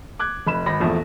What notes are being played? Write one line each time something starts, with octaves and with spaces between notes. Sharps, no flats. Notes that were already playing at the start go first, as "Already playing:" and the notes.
D6 F#6 G#6
F1 B5 E7
G#1 B5 A#6
A#1 E2 F3 A3